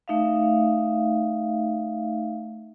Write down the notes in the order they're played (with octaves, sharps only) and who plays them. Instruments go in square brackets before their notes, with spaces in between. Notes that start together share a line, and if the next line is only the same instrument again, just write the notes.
[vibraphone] A3 D#4 E5 F5